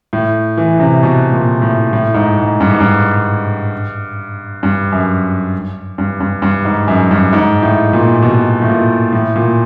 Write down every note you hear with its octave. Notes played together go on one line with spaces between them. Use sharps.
A2
E3
C3
B2
A#2
A2
A2
G#2
G#2
G2
G#2
G2
G2
F#2
G2
G2
G2
G#2
F#2
G2
G#2
A2
A#2
B2
A2
A#2
A2
A#2